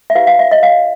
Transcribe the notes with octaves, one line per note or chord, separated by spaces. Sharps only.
E5
E4 G4 B4 F5
F5
E5
D#5
F5